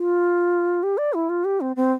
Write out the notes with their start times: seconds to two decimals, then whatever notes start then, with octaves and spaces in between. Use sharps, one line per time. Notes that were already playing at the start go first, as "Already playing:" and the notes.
Already playing: F4
0.83 G4
0.98 D5
1.14 E4
1.29 F4
1.45 G4
1.61 C4
1.76 C4